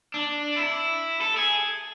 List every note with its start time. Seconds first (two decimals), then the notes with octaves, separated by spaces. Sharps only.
0.14 D4
0.56 E4
1.21 A4
1.37 G#4